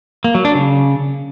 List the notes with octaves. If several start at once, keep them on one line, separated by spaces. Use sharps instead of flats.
A#3
F#3
D4
C#3